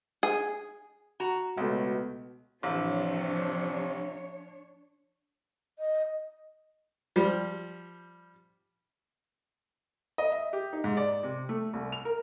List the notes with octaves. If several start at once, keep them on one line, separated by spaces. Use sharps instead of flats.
G#4
F#4 A#5
C#2 B2 A3
A1 C3 F3 D4 C#5
D#5
F3 G3
D#5
E5
G4
D#4
G#2
D5
C3
A3
C2
F7
A#4